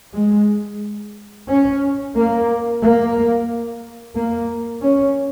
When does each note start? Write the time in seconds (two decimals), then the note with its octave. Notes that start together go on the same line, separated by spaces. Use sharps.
0.14 G#3
1.48 C#4
2.16 A#3
2.82 A#3
4.15 A#3
4.82 C#4